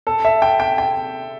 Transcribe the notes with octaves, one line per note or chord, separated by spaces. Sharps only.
A4
E5
G5
G5
G5